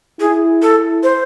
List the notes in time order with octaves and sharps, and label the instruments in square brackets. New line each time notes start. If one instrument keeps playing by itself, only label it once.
[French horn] E4 [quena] G#4
[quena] A4
C5